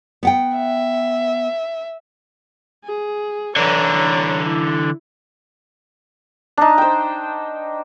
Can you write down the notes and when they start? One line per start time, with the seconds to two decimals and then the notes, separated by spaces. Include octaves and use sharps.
0.23 B3 F#5 G5
0.56 E5
2.84 G#4
3.56 D3 E3 C#5 A#5
4.43 E4
6.57 D4 D#4
6.78 C5 G5